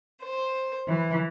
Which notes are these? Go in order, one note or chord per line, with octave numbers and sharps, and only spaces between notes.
C5
E3